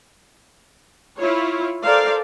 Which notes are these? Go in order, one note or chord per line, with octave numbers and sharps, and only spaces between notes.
E4 F4 C#5
A4 A#4 C5 D5 F5